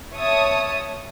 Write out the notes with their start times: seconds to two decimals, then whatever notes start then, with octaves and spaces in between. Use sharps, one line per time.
0.15 C#5 E5 A5 D#6